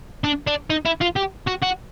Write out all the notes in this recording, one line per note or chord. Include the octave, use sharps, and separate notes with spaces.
D4
D4
D#4
E4
F4
G4
F#4
F#4